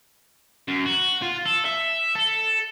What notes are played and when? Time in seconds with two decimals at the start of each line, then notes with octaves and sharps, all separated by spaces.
0.68 F#2
0.86 F#4
1.22 F4
1.46 A4
1.65 E5
2.16 A4